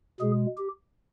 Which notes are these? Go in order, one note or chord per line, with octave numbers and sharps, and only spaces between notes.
B2 G#3 G#4
G4